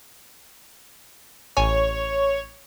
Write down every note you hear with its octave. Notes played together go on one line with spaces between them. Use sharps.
A1 C#5 G#5